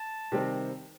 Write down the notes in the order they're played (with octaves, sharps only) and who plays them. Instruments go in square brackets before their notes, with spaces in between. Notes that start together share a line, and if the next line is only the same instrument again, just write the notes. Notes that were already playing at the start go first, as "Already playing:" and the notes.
Already playing: [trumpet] A5
[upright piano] C3 D#3 G3 C4